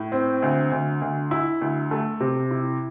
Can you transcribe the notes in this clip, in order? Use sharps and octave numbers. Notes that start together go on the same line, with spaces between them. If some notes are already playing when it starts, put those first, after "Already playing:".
Already playing: A2
C4
D2
D2
D2
E4
D2
A3
C3
E4